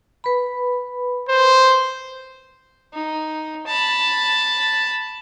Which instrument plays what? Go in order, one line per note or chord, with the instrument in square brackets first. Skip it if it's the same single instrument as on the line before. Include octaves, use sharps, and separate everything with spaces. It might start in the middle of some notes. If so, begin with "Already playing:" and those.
[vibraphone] B4 B5
[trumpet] C5
[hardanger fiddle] D#4
A5 B5